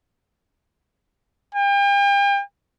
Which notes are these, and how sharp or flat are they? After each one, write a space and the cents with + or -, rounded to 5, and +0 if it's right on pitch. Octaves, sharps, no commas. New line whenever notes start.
G5 +40